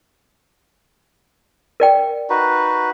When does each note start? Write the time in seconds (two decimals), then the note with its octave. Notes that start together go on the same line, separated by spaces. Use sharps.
1.80 A#4 D5 G5
2.30 D#4 F#4 B4